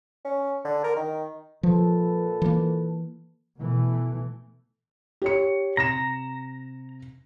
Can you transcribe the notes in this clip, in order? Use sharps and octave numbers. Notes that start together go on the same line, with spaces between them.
C#4
D3
A#4
D#3
A#2 F3 A4 B4
E3 A#3
B2 E3 A3
G4 C#5 C#7
C3 A#5 A#6 E7